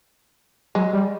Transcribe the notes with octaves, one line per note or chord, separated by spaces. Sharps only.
F#3 G#3
G3